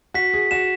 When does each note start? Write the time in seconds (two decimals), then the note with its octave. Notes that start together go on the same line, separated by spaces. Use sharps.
0.14 F#4 B6
0.34 G#4
0.51 F#4 E7